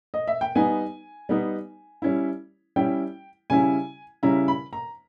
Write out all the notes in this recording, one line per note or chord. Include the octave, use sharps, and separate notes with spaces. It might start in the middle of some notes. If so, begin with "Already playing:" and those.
D#5
E5
G5
G3 B3 D#4 G#5
G3 B3 D#4
G3 C#4 E4
G3 C#4 E4 G5
C#3 G3 C#4 E4 G#5
C#3 G3 C#4 E4 A#5
B5
A#5